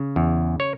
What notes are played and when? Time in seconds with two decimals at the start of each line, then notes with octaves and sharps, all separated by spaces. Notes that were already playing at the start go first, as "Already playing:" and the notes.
Already playing: C#3
0.16 E2
0.60 C#5